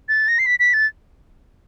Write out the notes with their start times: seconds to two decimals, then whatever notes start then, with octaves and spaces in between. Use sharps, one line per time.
0.09 A6
0.28 A#6
0.39 C7
0.46 B6
0.59 B6
0.74 A6